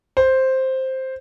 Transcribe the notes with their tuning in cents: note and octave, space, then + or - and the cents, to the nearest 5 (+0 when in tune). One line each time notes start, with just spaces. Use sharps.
C5 +5